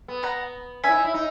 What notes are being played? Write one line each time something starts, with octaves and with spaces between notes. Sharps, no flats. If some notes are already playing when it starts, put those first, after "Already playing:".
B3
F#5 A#5
C#4 E5 G#5
E4
D#4
E4
D#4